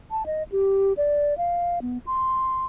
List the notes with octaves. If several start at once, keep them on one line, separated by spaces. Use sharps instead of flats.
A5
D#5
G4
D5
F5
B3
C6